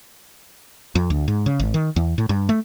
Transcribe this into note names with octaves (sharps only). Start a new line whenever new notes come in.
F2
D2
G#2
C#3
G#1
D#3
E2
A2
G2
A3